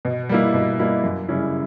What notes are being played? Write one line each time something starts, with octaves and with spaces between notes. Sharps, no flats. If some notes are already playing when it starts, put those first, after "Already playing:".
B2
G3 A#3 E4
B2
G3 A#3 E4
F#2
C#3 G3 C#4 E4